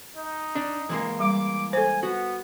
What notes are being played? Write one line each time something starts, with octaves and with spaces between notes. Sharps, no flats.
D#4
D4
E3 G#3 A#3
G3 D6
A4 C5 G#5
B3 F#4